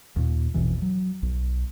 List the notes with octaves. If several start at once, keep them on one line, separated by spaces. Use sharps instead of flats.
D#2 A#2
G#1 E2 B2 E3
F#3
B1